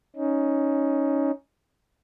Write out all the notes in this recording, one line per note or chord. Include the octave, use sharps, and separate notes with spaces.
C#4 D#4